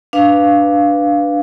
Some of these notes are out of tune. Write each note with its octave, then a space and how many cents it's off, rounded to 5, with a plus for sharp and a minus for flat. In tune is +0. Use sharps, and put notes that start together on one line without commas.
D4 +0 B4 +0 F5 -5